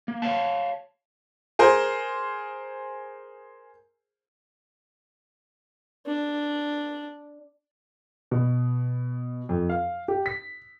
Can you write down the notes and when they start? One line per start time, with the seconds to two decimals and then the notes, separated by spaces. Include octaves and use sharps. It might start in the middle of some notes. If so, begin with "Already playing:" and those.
0.08 A#3
0.22 C#5 D5 F5 A5
1.59 G#4 A#4 C5
6.06 D4
8.31 B2
9.49 F2
9.69 F5
10.08 G4
10.26 B6